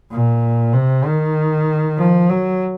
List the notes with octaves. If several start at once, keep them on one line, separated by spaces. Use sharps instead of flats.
A#2
C3
D#3
F3
F#3